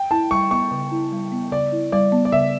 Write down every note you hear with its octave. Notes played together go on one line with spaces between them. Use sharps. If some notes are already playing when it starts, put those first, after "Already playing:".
Already playing: G5
E4 A5
G3 C#6
B3 C#6
C#3
E4
G3
B3
C#3 D5
E4
G3 D5
B3
D5
C#3 E5